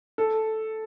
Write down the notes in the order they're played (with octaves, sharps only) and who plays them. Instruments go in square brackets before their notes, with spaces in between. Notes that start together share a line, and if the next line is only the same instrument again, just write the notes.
[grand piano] A4